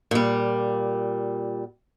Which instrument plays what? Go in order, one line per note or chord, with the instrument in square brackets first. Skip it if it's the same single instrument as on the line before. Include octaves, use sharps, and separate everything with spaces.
[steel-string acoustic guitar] A#2 G3